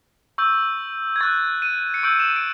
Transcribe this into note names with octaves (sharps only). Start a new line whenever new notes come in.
C#6 E6 G6
G#6
C#6 F#6 A6
D#7
C#7
C#6 E6 G6 D7
E7
D#7
D7